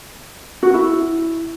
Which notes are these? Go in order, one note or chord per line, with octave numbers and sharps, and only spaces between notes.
F#4
E4